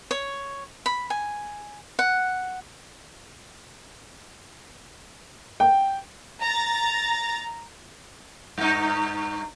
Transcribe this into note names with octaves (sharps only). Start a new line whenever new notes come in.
C#5
B5
G#5
F#5
G5
A#5 A6
G2 D#4